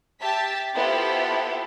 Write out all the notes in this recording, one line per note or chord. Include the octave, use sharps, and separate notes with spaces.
G4 E5 A5 A6 B6
B3 E4 F4 G4 A4 C5